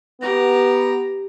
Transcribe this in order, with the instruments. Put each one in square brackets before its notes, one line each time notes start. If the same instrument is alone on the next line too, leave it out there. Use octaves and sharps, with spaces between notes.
[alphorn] B3 [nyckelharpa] G4 A#5